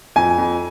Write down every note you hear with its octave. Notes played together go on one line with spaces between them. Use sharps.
F2 G#5
F2